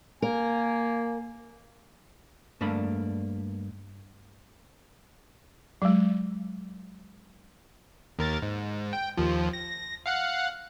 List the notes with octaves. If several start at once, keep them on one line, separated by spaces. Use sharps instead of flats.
A#3 A#4 G#5
G2 A3 A#3 D4 B5
F#3 G#3
D#2 A#4 A6
G#2
G5
D#2 F3
A#6
F5 F#5 F#6